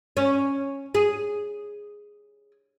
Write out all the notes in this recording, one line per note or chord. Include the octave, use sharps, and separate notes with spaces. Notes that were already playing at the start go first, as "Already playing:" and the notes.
C#4
G#4